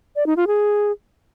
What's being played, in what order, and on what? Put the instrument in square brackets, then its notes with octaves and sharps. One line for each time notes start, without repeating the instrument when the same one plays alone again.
[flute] D5
D#4
F4
G#4